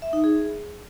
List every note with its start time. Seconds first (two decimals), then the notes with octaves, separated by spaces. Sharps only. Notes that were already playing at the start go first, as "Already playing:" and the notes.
0.02 E5
0.13 D#4
0.24 G#4